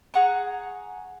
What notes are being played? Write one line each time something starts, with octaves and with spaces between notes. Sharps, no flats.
G#4 F#5 A#5 C#6